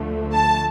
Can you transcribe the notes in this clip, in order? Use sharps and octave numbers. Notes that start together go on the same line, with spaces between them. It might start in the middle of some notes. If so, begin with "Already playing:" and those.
Already playing: D2 D3 F3 A3
A5